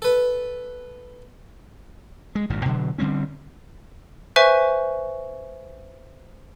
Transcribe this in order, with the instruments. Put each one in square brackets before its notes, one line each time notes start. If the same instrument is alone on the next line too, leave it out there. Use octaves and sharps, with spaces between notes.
[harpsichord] A4 B4
[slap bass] G#3
G#1 G2 A#2
B2 D3 D#3 F#3
D3 G3 C4 C#4
[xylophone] B4 C5 E5 G#5 C#6